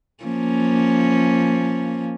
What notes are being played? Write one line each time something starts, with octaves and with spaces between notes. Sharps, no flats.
F3 A#3 C#4